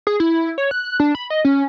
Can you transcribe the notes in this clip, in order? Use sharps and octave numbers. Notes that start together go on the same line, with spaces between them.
G#4
E4
C#5
F#6
D4
B5
D#5
C#4